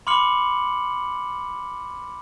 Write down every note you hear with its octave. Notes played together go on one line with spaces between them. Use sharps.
B5 C6 D6 F6 C#7 F#7